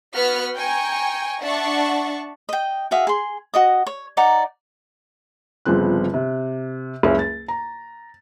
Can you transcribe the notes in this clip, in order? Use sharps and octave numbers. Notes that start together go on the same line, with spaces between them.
B3 F#4 F#5 F6 B6
G5 G#5 A#5 C#6
D4 E5 F#5 A5 C#6
D#5 G5
F#4 G#4 E5 F5
G#4 C6
F#4 D#5 D#6
C#5
D#4 D5 F#5 A#5
G1 C#3 F3 C4 F#6
C3
F#1 C#2 C#4 E5
A6
A#5